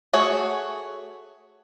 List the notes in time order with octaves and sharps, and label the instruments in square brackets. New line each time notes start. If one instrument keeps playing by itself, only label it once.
[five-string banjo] A3 F#4 G#4 C#5